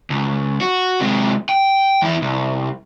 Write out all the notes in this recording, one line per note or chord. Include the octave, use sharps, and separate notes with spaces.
C#2
F#4
C3 G#3
G5
E2 E4
C2